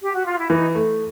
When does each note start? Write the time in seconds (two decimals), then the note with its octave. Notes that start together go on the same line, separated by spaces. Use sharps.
0.00 G4
0.13 F#4
0.25 F4
0.38 E4
0.50 E3 D#4
0.75 A3